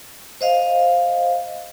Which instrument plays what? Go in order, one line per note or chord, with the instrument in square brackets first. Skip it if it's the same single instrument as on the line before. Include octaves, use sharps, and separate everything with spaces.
[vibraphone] C5 D#5 F5